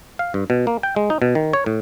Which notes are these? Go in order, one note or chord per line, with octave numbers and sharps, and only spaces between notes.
F5
G2
B2
A#3
G5
G#3
D#4
B2
D#3
C#5
A2